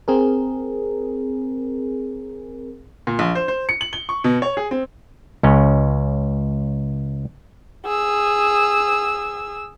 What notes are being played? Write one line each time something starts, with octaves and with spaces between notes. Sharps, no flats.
C4 G#4 A#4
A#2
A#1
C5
C5
C#7
F#7
G7
C#6
B2
C#5
G#4
C4
C#2 C#4
G#4 E6